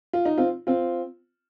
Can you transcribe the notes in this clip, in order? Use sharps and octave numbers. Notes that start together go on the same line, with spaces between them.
F4
D#4
C4 F4
C4 F4